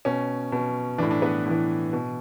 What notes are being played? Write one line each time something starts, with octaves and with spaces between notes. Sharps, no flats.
B2 C#4
B2
A2 E3 D4
D4
B3 B4
A2 E3
B2